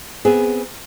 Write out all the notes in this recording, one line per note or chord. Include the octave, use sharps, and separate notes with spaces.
B3 C4 G#4